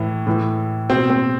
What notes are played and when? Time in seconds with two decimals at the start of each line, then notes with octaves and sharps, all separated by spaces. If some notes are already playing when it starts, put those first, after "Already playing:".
Already playing: A2 E3
0.27 A2 E3
0.89 B2 C4
1.10 C4